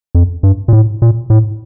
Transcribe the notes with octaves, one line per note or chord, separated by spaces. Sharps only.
F2
G2
A#2
A2
A#2
A2